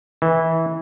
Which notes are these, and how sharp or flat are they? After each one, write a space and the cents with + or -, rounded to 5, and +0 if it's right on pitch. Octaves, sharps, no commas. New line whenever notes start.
E3 -20